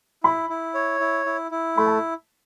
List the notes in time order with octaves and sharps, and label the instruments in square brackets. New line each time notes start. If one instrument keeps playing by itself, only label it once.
[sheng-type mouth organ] E4 [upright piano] B5
[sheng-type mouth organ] E4
C#5
E4
E4
E4
[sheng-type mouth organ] A3 [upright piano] B5
[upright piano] A5